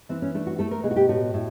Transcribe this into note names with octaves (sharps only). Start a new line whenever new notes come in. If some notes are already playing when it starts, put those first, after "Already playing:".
E3 C4
C#4
A3 D4
F#4
A3 A4
A#4
B2 G#4
F#4
G4
A2 F#4
A2